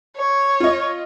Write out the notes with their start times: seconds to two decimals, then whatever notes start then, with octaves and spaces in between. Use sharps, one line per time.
0.17 C#5
0.60 F4 D#5